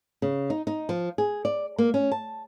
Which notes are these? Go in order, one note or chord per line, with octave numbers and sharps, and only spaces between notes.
C#3
D#4
D#4
F3
G#4
D5
A#3
C#4
A5